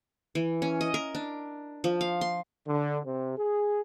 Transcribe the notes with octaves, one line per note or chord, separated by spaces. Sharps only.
E3
C#4
D#5
A#4
D4
F3
F5
C6
D3
C3
G#4